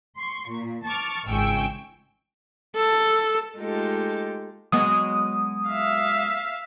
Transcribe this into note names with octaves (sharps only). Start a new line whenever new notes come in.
C6 C#6
A#2
A5 C#6 D6 F6
G#1 C#2 G#4 G5 C#6 E6
A4
G#3 A3 D#4 F4 G4 A4
F#3 G#3 B3 D#6
E5 F5